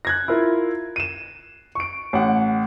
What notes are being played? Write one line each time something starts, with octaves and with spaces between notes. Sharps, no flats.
F#6 G#6 A#6
E4 F4 A#4
D#7 E7
C#6 D7
A1 F#5